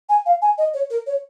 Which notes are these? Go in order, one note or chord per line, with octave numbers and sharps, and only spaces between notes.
G#5
F5
G#5
D#5
C#5
A#4
C#5